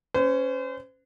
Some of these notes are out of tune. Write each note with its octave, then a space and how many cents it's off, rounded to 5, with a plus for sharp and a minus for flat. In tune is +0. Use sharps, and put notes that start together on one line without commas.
C#4 +0 C5 -40